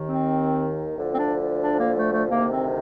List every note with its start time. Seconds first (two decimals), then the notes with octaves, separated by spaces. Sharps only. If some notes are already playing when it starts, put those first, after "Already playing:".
Already playing: D#2 D#3
0.09 C4
0.98 D2 D3 F3
1.14 C4
1.19 D4
1.64 D4
1.80 A#3
1.97 A3
2.13 A3
2.29 D2 C3 D#3 A#3
2.52 C4